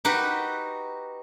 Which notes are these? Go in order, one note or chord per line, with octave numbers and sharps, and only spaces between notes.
D#4 F#4 G4 B4